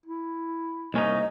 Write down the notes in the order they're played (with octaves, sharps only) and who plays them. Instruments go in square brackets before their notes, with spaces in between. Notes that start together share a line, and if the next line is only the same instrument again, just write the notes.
[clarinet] E4
[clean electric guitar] C2 C#4 D#4 [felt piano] A#3 [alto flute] D#5